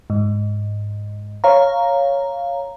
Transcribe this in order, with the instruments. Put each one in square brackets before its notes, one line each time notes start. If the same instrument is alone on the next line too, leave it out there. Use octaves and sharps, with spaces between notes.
[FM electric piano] G#2
C#5 F5 A#5